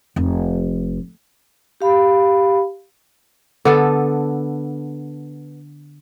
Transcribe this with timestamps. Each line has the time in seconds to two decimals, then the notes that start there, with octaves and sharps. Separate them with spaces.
0.16 F1
1.81 G4 F5 B5
3.65 D3 B3 A4